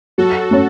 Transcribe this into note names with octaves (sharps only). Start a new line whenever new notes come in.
F#3 F#4 A4
A3 C#4